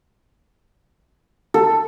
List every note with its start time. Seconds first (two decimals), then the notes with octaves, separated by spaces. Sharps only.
1.54 A4